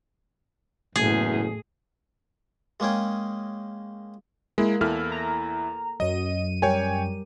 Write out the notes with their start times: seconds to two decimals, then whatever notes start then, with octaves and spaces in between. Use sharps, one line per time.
0.96 F#1 E2 A2 G#4
2.80 G#3 A#3 C#4 G#4 G5
4.58 G#3 A#3 E4 A#4
4.81 E2 E4 A4 F6
5.11 A#5
6.00 F#2 F#3 D#5 D#7
6.62 G3 G4 A#4 C#5 G5 G#5